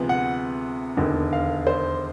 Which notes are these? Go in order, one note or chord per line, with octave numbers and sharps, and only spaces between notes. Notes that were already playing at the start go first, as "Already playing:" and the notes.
Already playing: D2 C3 F3 G#3 B3
F#5
E1 D#2 D3
F5
C5